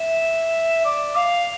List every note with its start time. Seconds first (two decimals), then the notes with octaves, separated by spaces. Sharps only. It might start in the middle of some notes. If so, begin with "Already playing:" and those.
Already playing: E5
0.85 D5
1.16 F5